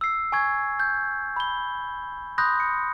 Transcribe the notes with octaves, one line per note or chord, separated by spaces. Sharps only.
E6 C7
G#5 C#6 G#6
G6
B5 G7
B5 C6 D#6 F#6 G6 A#6
C#7